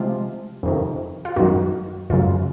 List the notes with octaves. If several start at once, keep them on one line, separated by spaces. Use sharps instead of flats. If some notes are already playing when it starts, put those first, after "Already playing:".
Already playing: C3 F3 G#3 F4
F2 C3 D#3
F4
F#2 D#3 F#3 F#4
F#2 C#3 F#3 F4